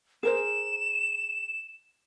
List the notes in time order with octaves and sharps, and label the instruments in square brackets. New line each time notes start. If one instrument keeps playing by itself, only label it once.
[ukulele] G#4 A#4 C5 [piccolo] E7